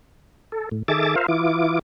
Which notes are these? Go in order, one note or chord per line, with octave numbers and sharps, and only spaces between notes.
A4
A2
D#3 G#4 A4 E5 D6 A6
F4 A#4 C5 E5 F5
E3 E4 F4 D6